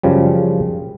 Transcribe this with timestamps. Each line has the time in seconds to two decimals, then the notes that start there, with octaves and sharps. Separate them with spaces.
0.03 F#2 C#3 F3 G3